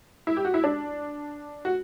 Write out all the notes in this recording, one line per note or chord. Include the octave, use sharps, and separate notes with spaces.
E4
G4
F#4
E4
D4
F#4